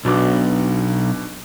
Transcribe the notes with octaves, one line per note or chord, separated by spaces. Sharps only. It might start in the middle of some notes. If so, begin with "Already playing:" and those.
B1 B2 D4 D6